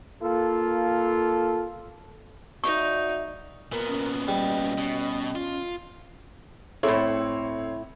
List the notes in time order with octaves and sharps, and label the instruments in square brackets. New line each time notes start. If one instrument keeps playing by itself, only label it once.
[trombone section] A#3 F4 A4
[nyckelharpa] D#4 [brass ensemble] F#4 D5 E5 [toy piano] C#6
[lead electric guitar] A#2 B3 [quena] A#4
[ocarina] C#4
[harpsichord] G3 [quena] D#5
[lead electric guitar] B2
F4
[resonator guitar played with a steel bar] A2 E4 [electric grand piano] C4 C6 [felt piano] A4 [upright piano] C#5